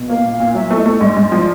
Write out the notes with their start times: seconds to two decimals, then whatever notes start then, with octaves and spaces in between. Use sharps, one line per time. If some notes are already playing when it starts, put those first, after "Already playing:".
Already playing: B2
0.09 A#3 F5
0.24 A#2
0.32 F5
0.40 A#2
0.54 F#3 E5
0.71 A3
0.78 D#5
0.86 A3
1.01 G#2 D5
1.17 G#2
1.32 F3